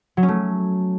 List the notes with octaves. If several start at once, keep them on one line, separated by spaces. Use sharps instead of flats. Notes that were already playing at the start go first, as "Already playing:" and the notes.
F#3
C#4
A3